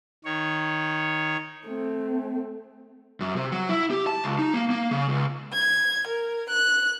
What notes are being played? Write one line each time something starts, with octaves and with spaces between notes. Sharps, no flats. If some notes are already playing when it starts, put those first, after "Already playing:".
D#3 C#5
A3 C4
F#2
C3
F#3
E4
G4
A5
C#2
D#4
A#3
A#3
C#3
C#2
G#6
A#4
F#6